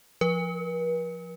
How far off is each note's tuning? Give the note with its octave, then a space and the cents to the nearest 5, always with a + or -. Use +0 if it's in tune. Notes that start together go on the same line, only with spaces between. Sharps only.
F3 +0 B4 -45